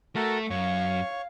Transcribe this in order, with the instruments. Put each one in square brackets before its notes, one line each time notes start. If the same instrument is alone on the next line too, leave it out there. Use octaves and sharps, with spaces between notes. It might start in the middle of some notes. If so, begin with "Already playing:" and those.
[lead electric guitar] A3 [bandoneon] F#4 A4 A#4
[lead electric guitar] F#2 [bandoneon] C#5 C#6 [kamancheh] F5